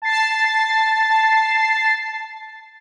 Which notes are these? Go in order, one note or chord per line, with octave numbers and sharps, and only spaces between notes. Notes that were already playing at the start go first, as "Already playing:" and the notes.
A5 A6 C7